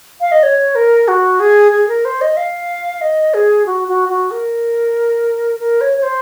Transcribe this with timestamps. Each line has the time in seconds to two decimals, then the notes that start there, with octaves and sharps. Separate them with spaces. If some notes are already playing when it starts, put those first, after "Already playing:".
0.20 F5
0.32 D#5
0.43 C#5
0.75 A#4
1.08 F#4
1.40 G#4
1.72 G#4
1.88 A#4
2.05 C5
2.21 D#5
2.37 F5
3.01 D#5
3.34 G#4
3.66 F#4
3.88 F#4
4.09 F#4
4.31 A#4
5.60 A#4
5.81 C#5
5.97 C#5
6.03 C5